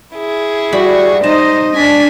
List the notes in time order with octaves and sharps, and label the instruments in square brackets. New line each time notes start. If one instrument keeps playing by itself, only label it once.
[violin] E4 G#4
[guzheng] G3 B5 [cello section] F#4
[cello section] D#4 D#5 [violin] C5 [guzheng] A5
[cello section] D4 [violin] G#5 B6